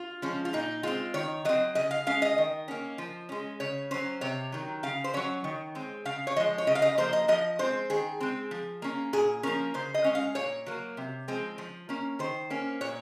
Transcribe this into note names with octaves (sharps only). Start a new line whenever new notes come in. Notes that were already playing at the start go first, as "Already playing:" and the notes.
Already playing: F4
F3 G#3 C#4
F4
A#2 D#4
G#3 C4 F4
D#3 C#5
F#3 C4 D#5
C#3 D#5
F5
G#3 C#4 F5
D#5
D#3
A#3 C#4
F3
G#3 C#4
C#3 C#5
F#3 C#4 C5
C3 C#5
D#3 F#3
C#3 F5
C5
F#3 C#4 C#5
D#3
G#3 C4
C#3 F5
C#5
F3 G#3 D#5
C#5
C#3 D#5
F5
D#5
F3 A#3 C5
D#5
F3 D#5
G#3 C4 C5
D#3 G#4
G#3 C4
F3
A#3 C#4
A#2 G#4
F3 A#3 C#4 A#4
C#3 C5
D#5
G#3 C#4
F5
A#2 C#5
F#3 A#3
C3
F3 G#3 C4
F3
A#3 C#4
D#3 C5
A#3 C#4
A#2 C#5